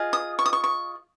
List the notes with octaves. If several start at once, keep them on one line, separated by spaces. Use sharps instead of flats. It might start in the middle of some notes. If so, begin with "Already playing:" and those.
Already playing: F4 G#4 D#5
D#6
C#6
D#6
C#6
C#6